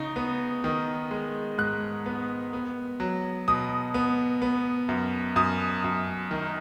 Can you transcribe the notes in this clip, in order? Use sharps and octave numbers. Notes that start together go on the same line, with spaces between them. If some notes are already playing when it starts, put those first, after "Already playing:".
Already playing: C#3 D#4
B3
D#3
G#3
G#2 F#6
B3
B3
F#3
B2 D#6
B3
B3
F#2
F#2 D#6
F#2
D#3